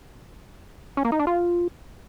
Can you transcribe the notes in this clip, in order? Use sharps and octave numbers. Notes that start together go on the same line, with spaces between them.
C#4
A#3
D#4
D4
F4